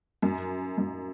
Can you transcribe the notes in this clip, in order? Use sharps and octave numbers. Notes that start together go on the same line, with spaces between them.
F#2
F#2